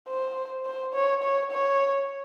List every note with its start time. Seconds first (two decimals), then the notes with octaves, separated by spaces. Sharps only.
0.08 C5
0.66 C5
0.94 C#5
1.23 C#5
1.51 C#5